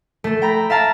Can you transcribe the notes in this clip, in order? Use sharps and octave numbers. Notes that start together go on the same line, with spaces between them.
A3 A4
G5 A#5 B5
E5 F5 A5 A#5